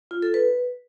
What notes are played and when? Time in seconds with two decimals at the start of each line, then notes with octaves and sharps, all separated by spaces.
0.11 F4
0.22 A4
0.34 B4